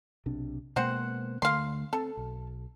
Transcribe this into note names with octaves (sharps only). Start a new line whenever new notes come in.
B1 C3 D4
B2 G#3 A#3 C4 C5 F#5
D2 D3 A3 F5 C6
C4 A4
B1